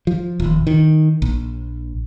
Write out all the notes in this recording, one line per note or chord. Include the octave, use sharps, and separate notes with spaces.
F3
D#1
D#3
A#1